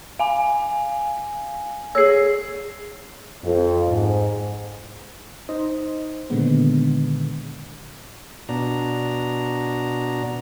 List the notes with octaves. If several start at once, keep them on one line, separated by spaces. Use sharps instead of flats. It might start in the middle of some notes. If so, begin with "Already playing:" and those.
F5 G#5
G#4 C#5 E6 C7
F2
G#2
D#4 C5 D#5
A#2 D3 D#3 G#3 B3
B2 D4 A#5